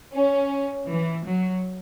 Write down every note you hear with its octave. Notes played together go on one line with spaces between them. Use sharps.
C#4
E3
F#3